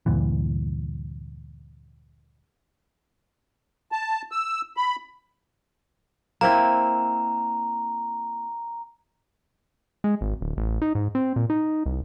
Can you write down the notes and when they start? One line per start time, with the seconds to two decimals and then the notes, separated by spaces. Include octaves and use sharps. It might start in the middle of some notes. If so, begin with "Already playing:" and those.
0.06 D2 G2 A#2 E3
3.92 A5
4.32 E6
4.77 B5
6.41 A#3 C4 E4 A#5
10.04 G#3
10.21 G#1
10.41 D1
10.57 A1
10.82 D#4
10.95 G#2
11.15 C4
11.36 A#2
11.50 D#4
11.86 C2